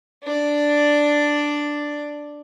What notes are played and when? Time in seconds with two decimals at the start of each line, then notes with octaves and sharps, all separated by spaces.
0.23 D4 D5